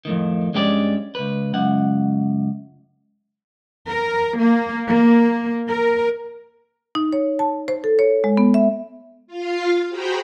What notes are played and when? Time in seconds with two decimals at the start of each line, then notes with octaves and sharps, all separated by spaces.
0.05 F2 A2 D#3
0.54 G2 G#3 C#4 G4 A4 D5
1.15 C#2 B4
1.54 C#2 F#2 F#5
3.88 A#4
4.39 A#3
4.88 A#3
5.69 A#4
6.95 D#4
7.13 C#5
7.39 A5
7.68 C5
7.84 A4
7.99 C#5
8.24 G#3
8.37 B3
8.54 E5
9.27 F4 F5
9.89 F#4 G#4 C5 G5 A#5 B5